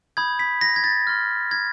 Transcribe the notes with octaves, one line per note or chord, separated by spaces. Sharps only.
B5 D#6 G6 G#6
B6
A#6
G#6
A6
C6 F6
G#6